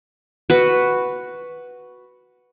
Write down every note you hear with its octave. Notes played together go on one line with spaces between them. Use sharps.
F#4 B4